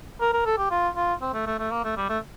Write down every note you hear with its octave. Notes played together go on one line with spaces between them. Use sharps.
A#4
A#4
A4
G4
F4
F4
C4
A3
A3
A3
A#3
A3
G3
A3